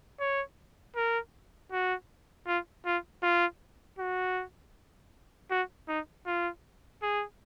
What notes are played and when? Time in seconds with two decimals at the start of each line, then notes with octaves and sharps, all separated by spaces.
0.20 C#5
0.96 A#4
1.72 F#4
2.47 F4
2.86 F4
3.23 F4
3.99 F#4
5.51 F#4
5.88 D#4
6.26 F4
7.02 G#4